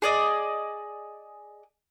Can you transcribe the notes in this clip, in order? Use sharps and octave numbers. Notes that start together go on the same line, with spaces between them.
G#4 D5 D#5